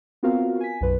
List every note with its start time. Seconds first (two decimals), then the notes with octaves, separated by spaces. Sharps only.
0.23 B3 C4 F4 F#4 A#4 F5
0.60 G#5 B6
0.81 B1 F#2 B4